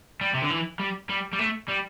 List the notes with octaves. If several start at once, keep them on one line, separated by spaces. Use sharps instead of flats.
G3
C3
D3
E3
G3
G3
G3
A3
G3